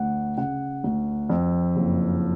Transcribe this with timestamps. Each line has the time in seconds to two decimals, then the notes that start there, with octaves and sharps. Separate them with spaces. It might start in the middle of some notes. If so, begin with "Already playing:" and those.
Already playing: D2 F#5
0.37 C#3 F#5
0.84 D2
1.29 F2
1.76 F#1